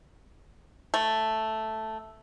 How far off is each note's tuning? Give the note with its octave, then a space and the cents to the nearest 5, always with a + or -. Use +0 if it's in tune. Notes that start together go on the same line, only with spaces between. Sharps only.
A3 +0